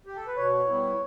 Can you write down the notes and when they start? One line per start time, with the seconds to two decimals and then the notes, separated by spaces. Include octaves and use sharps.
0.06 G4
0.16 A4
0.27 B4
0.37 B2 C#5
0.67 G3 B3 E4